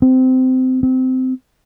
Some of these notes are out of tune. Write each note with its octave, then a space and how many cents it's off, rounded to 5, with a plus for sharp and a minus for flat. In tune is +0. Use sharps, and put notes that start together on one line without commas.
C4 -20
C4 -20